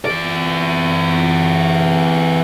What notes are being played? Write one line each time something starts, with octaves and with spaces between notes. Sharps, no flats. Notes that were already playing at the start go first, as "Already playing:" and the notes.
E3 D5